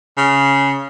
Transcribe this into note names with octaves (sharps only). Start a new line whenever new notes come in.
C#3